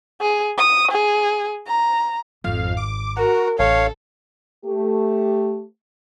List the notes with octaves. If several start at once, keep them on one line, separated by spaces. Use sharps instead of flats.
G#4
D#6
G#4
A#5
G#1 F2 G#2 F5
D6
F#4 A#4
A1 D3 C#4 A4 C#5 F5
A3 G4